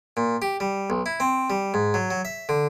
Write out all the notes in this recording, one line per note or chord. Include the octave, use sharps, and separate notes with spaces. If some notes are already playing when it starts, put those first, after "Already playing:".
A#2
G4
G3
B1
E4
C4
G3
G#2
F#3
F#3
E5
D3